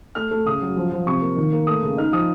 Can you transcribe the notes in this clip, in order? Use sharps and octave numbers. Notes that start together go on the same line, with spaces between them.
A3 F6
A3
C#3 D#6
F#3
F3
F3
C3 C#6
A#3
D#3
A#3
A3 D#6
C#3
D#4 F6
F3 D#6